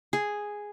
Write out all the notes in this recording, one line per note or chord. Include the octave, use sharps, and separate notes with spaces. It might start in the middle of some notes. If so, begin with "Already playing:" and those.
G#4